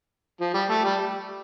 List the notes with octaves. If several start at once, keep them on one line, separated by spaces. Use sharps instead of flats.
F3
G3
A3
G3